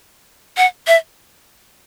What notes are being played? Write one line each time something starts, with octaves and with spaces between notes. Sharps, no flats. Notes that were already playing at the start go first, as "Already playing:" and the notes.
F#5
E5